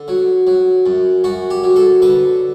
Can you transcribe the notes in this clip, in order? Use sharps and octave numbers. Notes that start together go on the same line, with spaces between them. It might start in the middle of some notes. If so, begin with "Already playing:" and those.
Already playing: D3
F#3
F#3
F#2
F#2 F#4
G4
F#3
A4
D3 B4